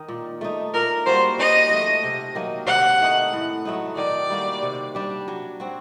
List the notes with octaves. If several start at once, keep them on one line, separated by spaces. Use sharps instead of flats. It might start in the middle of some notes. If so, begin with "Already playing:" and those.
Already playing: D#3 D#4
A#2
A3 D#4
A#2 A#4
G3 A#3 F#4 C5
D#3 D#5
F#3 A3
C3
D#3 F#3 A#3
C3 F#5
D#3 A3 D#4
A2
F#3 A3 D#4
D#3 D5
G3 A#3 F#4
C3
G3 D4 G4
F#3
C4 F#4